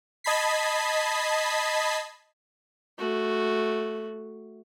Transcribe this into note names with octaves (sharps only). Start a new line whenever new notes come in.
D#5 A5 B5 G#6 B6 C7
A3 F#4